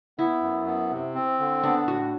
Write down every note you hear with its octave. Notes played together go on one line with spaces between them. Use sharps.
B3 E4
F#2
B3
C3
C4
D3
B3 D4
A2 F#4